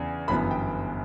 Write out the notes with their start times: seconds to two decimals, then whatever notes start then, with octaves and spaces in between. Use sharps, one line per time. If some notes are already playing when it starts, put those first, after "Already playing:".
Already playing: E2 C#3 D4
0.28 G1 F#2 E3 B3 B5
0.51 G5